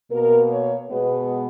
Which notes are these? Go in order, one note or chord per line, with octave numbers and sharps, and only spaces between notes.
B2 A#3 A#4
C#5
B2 G#3 B3 B4